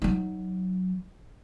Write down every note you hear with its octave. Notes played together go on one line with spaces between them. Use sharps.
F#3 D#4